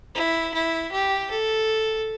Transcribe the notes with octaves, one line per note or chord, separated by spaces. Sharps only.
E4
E4
G4
A4